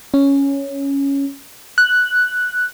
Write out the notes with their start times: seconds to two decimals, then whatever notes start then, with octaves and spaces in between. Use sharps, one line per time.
0.14 C#4
1.78 F#6